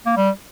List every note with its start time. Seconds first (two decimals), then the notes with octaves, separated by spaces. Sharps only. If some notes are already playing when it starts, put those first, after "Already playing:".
0.06 A#3
0.17 G3